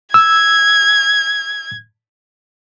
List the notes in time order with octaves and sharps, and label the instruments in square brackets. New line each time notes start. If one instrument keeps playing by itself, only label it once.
[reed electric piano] E6 [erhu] G#6